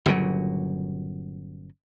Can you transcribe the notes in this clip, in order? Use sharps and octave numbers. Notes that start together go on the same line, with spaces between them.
G1 A#2 C#3 F#3